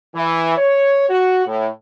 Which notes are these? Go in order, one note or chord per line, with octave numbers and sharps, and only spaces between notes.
E3
C#5
F#4
A2